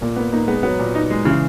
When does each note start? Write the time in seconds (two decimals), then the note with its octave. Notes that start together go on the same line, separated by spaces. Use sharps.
0.01 A#2 A#3
0.16 A#3 B3
0.32 A#3 D#4
0.48 G#3 B3
0.63 F#3 B3
0.79 A#2
0.95 D#4
1.10 G#3
1.25 C#3 E3